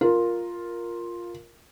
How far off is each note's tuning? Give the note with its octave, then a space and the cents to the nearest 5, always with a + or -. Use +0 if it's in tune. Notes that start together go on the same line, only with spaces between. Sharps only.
F4 +5 A#4 +0